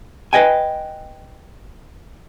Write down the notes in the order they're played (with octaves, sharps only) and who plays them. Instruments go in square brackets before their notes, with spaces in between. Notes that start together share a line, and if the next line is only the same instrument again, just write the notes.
[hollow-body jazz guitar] B4 C5 D#5 G5 G#5